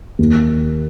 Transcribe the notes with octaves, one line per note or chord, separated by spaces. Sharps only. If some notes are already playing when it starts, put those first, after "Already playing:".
D#2